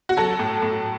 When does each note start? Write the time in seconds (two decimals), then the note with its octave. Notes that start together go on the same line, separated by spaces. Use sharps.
0.09 F#4
0.17 F#3 A4
0.39 A2
0.62 A2